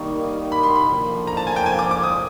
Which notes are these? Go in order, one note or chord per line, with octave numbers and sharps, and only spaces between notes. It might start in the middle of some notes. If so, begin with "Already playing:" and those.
Already playing: D#3 G3 A#3 D#4 C#6
B5
C6
B5
D3 F3 A#3
A#5
A5
G#5
G5
G#5
D6
D6
D#6